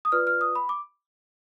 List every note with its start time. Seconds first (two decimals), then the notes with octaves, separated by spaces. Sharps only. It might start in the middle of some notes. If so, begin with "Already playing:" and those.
0.05 D#6
0.12 F4 B4 D5 F6
0.27 F6
0.41 D#6
0.55 B5
0.69 D6